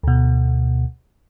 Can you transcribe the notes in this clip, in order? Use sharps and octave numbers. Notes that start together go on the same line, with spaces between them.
D2 B2